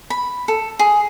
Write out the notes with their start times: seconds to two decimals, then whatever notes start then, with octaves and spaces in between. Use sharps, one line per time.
0.10 B5
0.48 A4
0.79 G#4